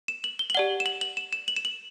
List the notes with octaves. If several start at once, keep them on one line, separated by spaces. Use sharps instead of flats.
E7
F#7
G7
F#7
G4 D5 F#5 G7
E7
F#7
F#7
E7
E7
F#7
E7
F#7